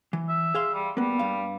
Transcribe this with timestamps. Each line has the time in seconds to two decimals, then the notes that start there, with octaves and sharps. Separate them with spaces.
0.13 E3
0.29 E5
0.55 G#4 F5 C6
0.74 G3
0.97 G3 A#3 B3
1.19 G2 F5